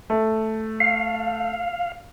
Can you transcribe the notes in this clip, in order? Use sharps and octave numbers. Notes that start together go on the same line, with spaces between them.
A3
F5